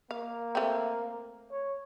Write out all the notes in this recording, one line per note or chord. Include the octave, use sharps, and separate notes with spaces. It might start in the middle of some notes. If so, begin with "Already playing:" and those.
A#3 F5
A3 C4
C#5